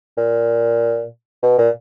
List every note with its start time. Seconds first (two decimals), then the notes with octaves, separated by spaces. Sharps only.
0.18 A#2
1.43 B2
1.58 A#2